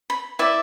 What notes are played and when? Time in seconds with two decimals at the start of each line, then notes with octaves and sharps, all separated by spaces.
0.10 B5
0.39 E4 B4 D5 E5